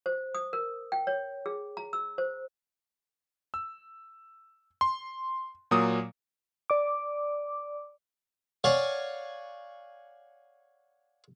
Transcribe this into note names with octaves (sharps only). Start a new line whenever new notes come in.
C5
D#6
A#4
G5
C#5
G#4
A#5
E6
C5
E6
C6
A#2 F#3 A#3 D#6
D5 D6
C#5 D5 F5 F#5 G#5